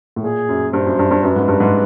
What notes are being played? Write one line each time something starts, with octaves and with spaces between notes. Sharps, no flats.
A2
A#2 G#4
F#2
G2 C5
F#2
G2
G2
F#2 B4
G#2
G2
G#2